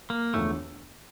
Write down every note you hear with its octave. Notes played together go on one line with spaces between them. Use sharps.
A#3
E1 E2 D3 F3 A3